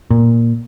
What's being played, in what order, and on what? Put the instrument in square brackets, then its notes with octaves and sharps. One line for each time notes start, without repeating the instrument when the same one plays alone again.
[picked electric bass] A#2